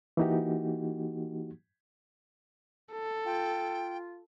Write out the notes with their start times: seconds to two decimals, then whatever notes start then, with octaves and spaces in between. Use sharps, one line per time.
0.17 E3 A#3 D#4 F#4 G4
2.93 A4
3.26 F4 G5